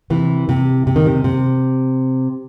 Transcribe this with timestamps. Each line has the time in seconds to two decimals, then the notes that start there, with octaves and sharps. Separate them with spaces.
0.10 C3 E3
0.49 C3
0.87 C3
0.96 D#3
1.06 C3
1.24 C3